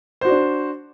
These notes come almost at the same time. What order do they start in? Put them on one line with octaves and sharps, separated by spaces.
C5 F#4 D5 D4